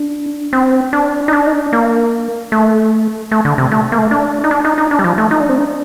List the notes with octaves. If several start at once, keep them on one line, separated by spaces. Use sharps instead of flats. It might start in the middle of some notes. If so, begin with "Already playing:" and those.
Already playing: D4
C4
D4
D#4
D4
D#4
D4
A#3
A3
A3
D3
C3
A3
A#3
A3
D4
D#4
D4
D#4
D#4
D4
G3
F3
A3
D#4
D4
C4
D4